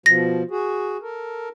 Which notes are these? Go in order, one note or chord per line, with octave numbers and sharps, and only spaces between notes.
B2 F3 A#6
F#4 G#4
A4 A#4